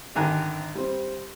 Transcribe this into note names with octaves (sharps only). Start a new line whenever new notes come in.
G#1 D3 D#3 G#5 A#5 F#6
G3 C4